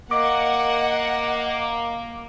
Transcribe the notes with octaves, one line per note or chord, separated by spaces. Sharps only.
A#3 D#5 F#5 D6